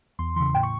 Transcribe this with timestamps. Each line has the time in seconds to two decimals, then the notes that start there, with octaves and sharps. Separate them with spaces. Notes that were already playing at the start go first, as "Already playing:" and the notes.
0.19 E2 C6
0.36 C#3 E3 C6
0.54 A2 G5
0.63 C#6